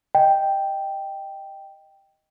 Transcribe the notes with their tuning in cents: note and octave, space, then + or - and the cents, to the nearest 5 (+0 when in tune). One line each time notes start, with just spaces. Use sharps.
D#5 +0 G5 +0